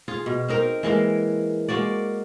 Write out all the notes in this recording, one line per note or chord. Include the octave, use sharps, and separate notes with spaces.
F4 G#4
B2
C4 D#4 A#4
E3 G#3 A#3 A#4
G#3 A#3 F#4 D5